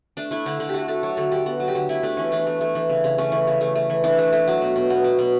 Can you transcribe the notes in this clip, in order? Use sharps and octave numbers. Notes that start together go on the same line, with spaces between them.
A3 D4
A3 E4
D3 D4
D3 D4
G4
A3 F#4
A3 A4
F#3 C#5
D3 A4
D3 G4
B3 F#4
F#3
G4
D3
A3 E4
A3 D4
E3 C#4
E3 D4
A3
A3
E3
C#3
C#3
A3 C#4
E3
C#3
A3
A3
E3
E3 D4
A3
A3
F#3
B2
B2
B3
F#3
B2